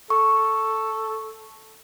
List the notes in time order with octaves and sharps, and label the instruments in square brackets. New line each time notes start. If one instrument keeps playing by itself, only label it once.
[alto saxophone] A4 [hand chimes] C#6